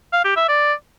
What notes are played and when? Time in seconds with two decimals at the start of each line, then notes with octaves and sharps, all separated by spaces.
0.13 F5
0.25 G4
0.36 E5
0.48 D5